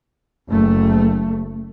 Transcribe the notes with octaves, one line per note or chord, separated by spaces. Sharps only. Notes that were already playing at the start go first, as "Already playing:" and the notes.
F#1 A3